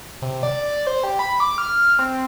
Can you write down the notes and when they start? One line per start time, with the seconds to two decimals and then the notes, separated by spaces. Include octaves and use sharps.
0.22 C3
0.43 D5
0.62 D5
0.87 C5
1.04 G4
1.19 B5
1.40 D6
1.58 F6
1.99 C4